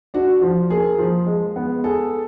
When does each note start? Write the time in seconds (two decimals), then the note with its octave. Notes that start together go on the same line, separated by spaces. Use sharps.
0.14 D4 F#4
0.42 F3
0.70 A#3 G#4
0.98 F3
1.27 G#3
1.56 B3
1.84 G#4 A4